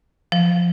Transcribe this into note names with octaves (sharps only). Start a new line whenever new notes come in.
F3